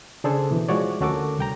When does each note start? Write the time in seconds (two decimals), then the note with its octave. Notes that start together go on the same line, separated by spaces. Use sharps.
0.24 C#3 D4 G#4 A4 C5
0.51 B2 E3
0.69 F3 G#3 E4 F#4 C#5 D5
1.01 D2 C#4 F#4 A4 A#4 D6
1.39 C2 G5 A#5